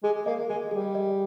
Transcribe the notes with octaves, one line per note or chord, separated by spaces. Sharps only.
G#3 G#4
A#3 D#5
G#3 G#4
G3 G#4
D#5